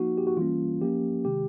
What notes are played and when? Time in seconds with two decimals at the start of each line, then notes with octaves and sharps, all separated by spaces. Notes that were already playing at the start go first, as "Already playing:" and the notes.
Already playing: F3 A#3 D#4 F#4
0.18 G4
0.27 F#4
0.37 E3 G3 A#3 C#4 F4
0.82 F3 A#3 C#4 G4
1.25 C3 D#3 G#3 G4